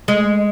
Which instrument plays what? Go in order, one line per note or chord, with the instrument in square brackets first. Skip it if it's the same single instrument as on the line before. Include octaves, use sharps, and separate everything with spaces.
[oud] G#3